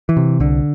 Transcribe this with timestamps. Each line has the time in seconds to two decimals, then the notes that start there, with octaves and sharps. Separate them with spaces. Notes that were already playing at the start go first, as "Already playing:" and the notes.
0.09 E3
0.17 C3
0.40 C2 D3